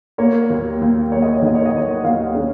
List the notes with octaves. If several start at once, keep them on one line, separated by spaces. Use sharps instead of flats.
A#3 C#5
D#2
D#2
A#3 C#5
D#5
C#5
D#3 D#5
C#5
D#5
A#3 C#5
F#5
D#2 F5
C#4